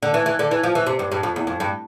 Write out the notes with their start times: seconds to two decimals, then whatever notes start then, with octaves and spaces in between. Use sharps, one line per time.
0.03 D3
0.14 E3
0.26 E3
0.39 D3
0.51 E3
0.63 F3
0.75 E3
0.86 C3
0.99 G2
1.12 G2
1.23 F2
1.36 E2
1.47 F2
1.60 G2